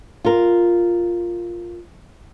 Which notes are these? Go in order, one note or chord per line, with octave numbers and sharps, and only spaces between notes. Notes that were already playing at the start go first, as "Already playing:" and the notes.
F4 A#4